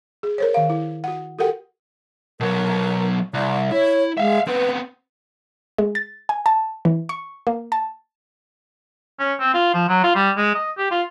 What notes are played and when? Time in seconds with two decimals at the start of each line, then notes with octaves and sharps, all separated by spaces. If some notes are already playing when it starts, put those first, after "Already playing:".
0.23 G#4
0.38 A#4 C5 C#5
0.54 D#3 F5
0.70 E4
1.04 F#4 F#5
1.39 F#4 G4 A4 A#4 F#5 G5
2.40 B2 F#3 A#4
3.34 C2 D5
3.72 E4 C#5
4.17 G#3 E5 F5
4.47 B3 C4 B4
5.78 G#3
5.95 A6
6.29 G#5
6.46 A5
6.85 E3
7.09 C#6
7.47 A#3
7.72 A5
9.19 C#4
9.40 C4
9.54 F4
9.74 F3
9.89 F#3
10.04 F4
10.15 G3
10.37 G#3
10.55 D#5
10.78 G4
10.91 F4